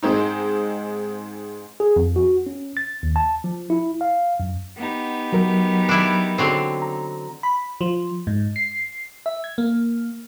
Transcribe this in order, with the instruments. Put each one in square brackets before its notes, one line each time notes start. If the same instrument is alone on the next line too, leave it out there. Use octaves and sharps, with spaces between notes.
[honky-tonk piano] G#2 G#3 C4 D#4
[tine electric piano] G#4
F2
F#4
C#4
A6
D#2
A5
F3
E4
F5
F#2
[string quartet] B3 D#4 G4
[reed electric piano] F#3 A#4
[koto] D4 E4
D3 F#3 C4
[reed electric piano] A#5
[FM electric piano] B5
F3
G#2
C7
E5
G#6
A#3